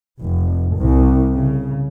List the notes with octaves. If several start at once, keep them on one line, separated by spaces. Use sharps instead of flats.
F1
C2
C#3